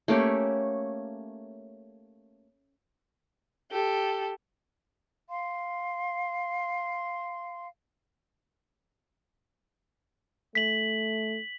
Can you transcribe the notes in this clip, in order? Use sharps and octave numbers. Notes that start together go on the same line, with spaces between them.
A3 A#3 C#4 G4
G4 A4
F5 C6
A3 B6 F#7